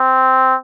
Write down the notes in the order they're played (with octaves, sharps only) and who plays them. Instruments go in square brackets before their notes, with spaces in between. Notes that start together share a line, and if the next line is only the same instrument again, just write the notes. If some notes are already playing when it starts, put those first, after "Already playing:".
Already playing: [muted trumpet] C4